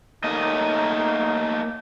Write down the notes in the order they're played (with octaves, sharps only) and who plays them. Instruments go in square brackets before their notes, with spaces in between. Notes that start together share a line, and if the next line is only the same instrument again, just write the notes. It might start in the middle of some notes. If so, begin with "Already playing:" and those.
[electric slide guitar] A3 A#3 D#5 [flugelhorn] D#4